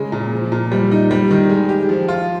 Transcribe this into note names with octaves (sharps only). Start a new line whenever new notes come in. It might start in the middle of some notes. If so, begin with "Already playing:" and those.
Already playing: C#3 G#3
A#2
F3
A#2
G3
D#4
G3
D#3
G#3
G4
F3
F4